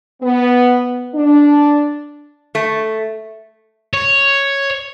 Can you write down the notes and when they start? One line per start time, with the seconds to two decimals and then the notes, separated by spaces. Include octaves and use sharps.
0.22 B3
1.15 D4
2.55 A3
3.93 C#5